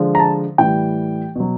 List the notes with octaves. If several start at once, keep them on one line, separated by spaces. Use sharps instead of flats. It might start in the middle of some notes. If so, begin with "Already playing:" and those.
Already playing: D3 F3 G#3
A#5
A5
A2 E3 G3 G5
B2 F#3